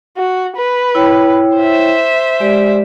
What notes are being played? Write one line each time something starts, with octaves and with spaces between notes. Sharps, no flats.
F#4
B4
E4 C#5 G5
C5 E5
G#3 G4 D5